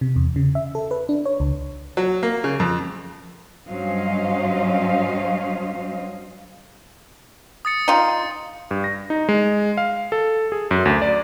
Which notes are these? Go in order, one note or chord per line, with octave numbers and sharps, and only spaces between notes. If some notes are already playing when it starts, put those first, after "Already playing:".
C3
E2
C#3
E5
A4
B4
D4
C#5
C#2
F#3
A#3
C#3
F2
G2 F#3 C#4 C5 D#5 F5
D#6 A6 C#7
D#4 F4
G2
A#6
D#4
G#3
F5
A4
G#4
F#2
D2
D5